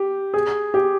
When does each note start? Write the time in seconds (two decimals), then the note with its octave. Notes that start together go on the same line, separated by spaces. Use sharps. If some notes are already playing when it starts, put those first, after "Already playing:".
Already playing: G4
0.34 G#4
0.74 G4